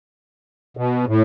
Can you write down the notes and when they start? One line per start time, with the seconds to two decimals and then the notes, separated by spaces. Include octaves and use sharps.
0.77 B2
1.08 A2